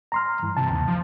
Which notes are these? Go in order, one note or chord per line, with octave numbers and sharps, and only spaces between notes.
A#5 C6 F6
G2 E3
C3 A5
D#2
F3